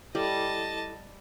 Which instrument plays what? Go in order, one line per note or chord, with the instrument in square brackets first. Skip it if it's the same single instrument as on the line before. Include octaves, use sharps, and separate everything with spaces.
[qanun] G3 [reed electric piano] E4 A4 D6 [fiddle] D#5 A5